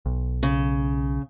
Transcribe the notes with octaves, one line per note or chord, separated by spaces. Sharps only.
B1
C#3